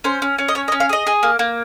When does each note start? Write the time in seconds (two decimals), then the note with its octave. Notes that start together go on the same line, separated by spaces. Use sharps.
0.04 C#4 C5
0.22 C#4
0.38 C#4
0.48 D#5
0.55 C#4 C#5
0.68 D#5
0.72 C#4
0.80 F5
0.89 G#4 D#5
1.07 G#4
1.23 A#3
1.39 A#3